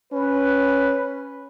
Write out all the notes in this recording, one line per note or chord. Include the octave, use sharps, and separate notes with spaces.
C#4 B4